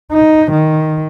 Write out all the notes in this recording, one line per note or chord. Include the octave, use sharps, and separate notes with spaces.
D#4
D#3